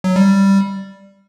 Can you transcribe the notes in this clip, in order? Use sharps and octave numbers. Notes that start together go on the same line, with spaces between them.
F#3
G3